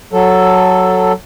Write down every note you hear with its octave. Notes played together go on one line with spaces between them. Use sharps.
F#3 A4